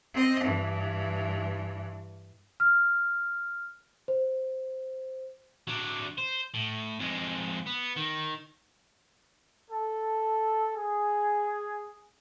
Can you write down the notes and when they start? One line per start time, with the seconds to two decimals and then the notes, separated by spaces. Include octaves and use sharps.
0.14 C4 D#5
0.44 G2 E3
2.60 F6
4.08 C5
5.67 F#3 D4
6.18 C5
6.54 A2
6.99 F2 G#3
7.66 B3
7.96 D#3
9.71 A4
10.77 G#4